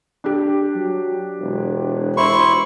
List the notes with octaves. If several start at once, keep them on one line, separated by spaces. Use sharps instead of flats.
D4 G4
F#3
E1
E4 C5 C#6